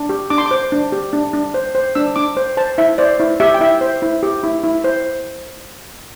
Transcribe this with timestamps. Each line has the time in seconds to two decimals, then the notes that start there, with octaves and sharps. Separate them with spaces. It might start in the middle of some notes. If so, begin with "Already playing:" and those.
Already playing: D4
0.09 G4
0.30 D4 D6
0.38 C6
0.46 D6
0.51 C5
0.72 D4
0.92 G4
1.13 D4
1.33 D4
1.54 C5
1.75 C5
1.95 D4 E6
2.16 D4 D6
2.37 C5
2.57 C5 A5
2.78 E4 E5
2.98 C5 D5
3.20 E4
3.40 G4 E5
3.54 G5
3.60 E4 E5
3.81 C5
4.02 E4
4.23 G4
4.43 E4
4.64 E4
4.84 C5